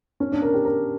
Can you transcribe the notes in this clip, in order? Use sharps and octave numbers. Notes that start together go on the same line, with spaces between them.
C#4
D4
A#4
G4
A#4